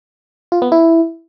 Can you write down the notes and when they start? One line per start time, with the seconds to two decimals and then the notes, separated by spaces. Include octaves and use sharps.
0.52 F4
0.62 B3
0.72 E4